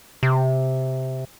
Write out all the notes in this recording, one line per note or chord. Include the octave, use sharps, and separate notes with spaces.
C3